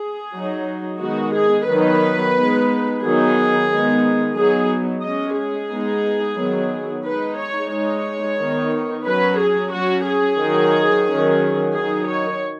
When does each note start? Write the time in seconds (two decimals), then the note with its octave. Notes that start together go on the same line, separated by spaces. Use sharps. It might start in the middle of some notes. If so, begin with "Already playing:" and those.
Already playing: G#4
0.33 F#3 D#4
1.00 D#3 G#3 B3 D#4 F#4
1.34 G#4
1.67 D#3 F#3 B3 D#4 B4
2.35 G#3 B3 D#4
3.01 D#3 F#3 B3 D#4 G#4
3.68 D#3 G#3 B3 D#4
4.35 F#3 B3 D#4 G#4
5.02 G#3 C#4 D#5
5.36 G#4
5.69 G#3 B3 D#4
6.36 D#3 F#3 B3
7.04 G#3 D#4 B4
7.38 C#5
7.71 G#3 D#4 C#5
8.38 D#3 B3 D#4
9.05 F#3 C#4 B4
9.39 G#4
9.72 F#3 C#4 F#4
10.06 G#4
10.39 D#3 F#3 D#4
11.07 D#3 F#3 C#4
11.73 D#3 F#3 D#4 G#4
12.08 C#5